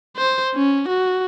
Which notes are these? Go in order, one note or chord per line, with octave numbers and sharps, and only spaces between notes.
C5
C#4
F#4